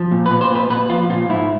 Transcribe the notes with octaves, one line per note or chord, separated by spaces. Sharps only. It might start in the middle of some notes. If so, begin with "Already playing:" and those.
Already playing: F3
A#2
B4
A#2
C5
A#2 B4
A#2 B4
F3 F4
A#2 F4
G#2 E4